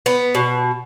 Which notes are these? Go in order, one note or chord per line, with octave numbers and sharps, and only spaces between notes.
B3
B2